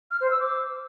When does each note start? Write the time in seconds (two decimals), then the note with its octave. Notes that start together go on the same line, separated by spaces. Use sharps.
0.11 F6
0.20 C5
0.30 E6
0.40 D6